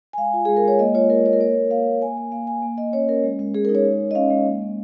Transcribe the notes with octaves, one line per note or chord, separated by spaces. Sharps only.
G#5
G#3 F5
F4
G#3 G#4
A#4
G#3 C#5
A#3 D#5
F4 C#5
F4 A#4
A#3 C#5
A#4
A#3 C#5
A#3
A#3 F5
A#3
A#3 G#5
A#3 G#5
A#3 F5
A#3 G#5
A#3
A#3 D#5
C#4 C#5
C#4 A#4
G#3
G#3
G#3 G#4
A#4
D#4
C#5
G#3
G#3
D#5
C#4 F5
G#3
A#3
A#3